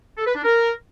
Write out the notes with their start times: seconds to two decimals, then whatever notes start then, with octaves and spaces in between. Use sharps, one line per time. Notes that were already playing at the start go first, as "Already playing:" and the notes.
0.18 A4
0.27 B4
0.35 D4
0.44 A#4